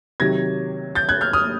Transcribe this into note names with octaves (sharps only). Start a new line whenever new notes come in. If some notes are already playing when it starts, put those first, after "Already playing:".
C3 D#3 F#3 G#6 A#6
G6 A6
F#6 G#6
F6 G6
D#6 F6